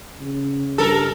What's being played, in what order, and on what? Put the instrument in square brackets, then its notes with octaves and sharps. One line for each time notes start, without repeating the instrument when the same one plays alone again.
[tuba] C#3
[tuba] G2 [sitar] A4 A#4